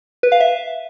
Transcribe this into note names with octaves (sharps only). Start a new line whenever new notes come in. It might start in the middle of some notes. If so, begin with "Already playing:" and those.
B4
F5
E5